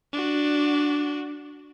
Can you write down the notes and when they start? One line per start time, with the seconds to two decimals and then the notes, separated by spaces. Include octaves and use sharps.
0.13 D4 F#4